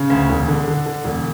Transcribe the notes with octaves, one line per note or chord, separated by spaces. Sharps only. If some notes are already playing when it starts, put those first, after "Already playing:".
Already playing: C#3
D2
E1
D3
D3
D3
E1